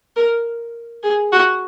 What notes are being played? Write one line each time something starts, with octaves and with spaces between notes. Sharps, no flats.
A#4
G#4
F#4